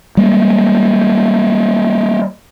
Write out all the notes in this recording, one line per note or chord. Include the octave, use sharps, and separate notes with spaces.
G3 G#3 A#3